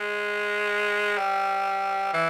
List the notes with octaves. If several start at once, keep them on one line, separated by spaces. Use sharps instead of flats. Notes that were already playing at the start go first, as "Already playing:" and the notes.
Already playing: G#3
G3
E3